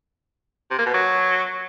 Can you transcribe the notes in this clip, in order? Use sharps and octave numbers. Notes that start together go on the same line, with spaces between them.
C3
A#3
B2
F#3